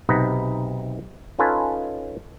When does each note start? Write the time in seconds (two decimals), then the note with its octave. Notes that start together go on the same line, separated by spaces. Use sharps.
0.09 B1 C3 D#4 B4 D#5 F#5
1.39 C#4 D#4 F4 A4 B4 G#5